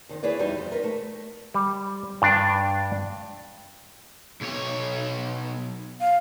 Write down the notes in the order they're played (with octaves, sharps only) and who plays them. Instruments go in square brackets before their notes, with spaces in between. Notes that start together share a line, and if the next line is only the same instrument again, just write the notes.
[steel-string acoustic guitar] F2 D#3
E4 G#4 B4 C#5 D5
E2 G3 D#4
F2
A#4 B4
A3
[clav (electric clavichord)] G3
G2 D4 D5
[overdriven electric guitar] B1 C#5
[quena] F5